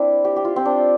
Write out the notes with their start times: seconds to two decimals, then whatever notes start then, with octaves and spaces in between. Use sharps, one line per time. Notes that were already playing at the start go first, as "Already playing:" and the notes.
Already playing: C4 D4 E4
0.25 G4
0.36 G4
0.45 F4
0.56 C4
0.65 D4